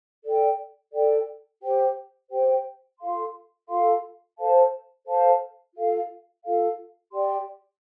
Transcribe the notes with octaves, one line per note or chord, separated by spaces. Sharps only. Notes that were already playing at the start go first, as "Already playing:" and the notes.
A4 D5 G5
A4 D5 G5
G4 C5 G5
G4 C5 G5
F4 A4 F5 C6
F4 A4 F5 C6
A4 C5 F5 A5
A4 C5 F5 A5
F4 A4 F5
F4 A4 F5
G4 D5 G5 C6